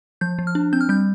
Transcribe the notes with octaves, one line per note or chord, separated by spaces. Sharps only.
F3 G6
F3
F6
D4
C4 G6
F6
G3 G6